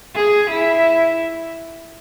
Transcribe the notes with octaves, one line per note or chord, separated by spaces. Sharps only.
G#4
E4